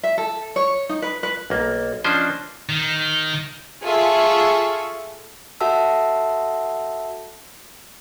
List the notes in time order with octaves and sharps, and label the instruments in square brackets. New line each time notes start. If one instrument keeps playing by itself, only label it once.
[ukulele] E5
A4
C#5
D#4
B4
B4
[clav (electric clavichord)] B1 A#3
F3 C#4 D4 C5 D#5
[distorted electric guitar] D#3
[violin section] F4 G#4 A4 E5 C#6
[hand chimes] F#4 A4 E5 F#5 A5 E6